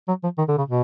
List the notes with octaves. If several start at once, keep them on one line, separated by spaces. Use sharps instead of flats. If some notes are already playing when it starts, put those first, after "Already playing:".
F#3
F3
D#3
D3
C#3
B2